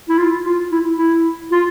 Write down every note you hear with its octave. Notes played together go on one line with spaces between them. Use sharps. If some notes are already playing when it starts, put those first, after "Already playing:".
E4
F4
F4
E4
E4
F4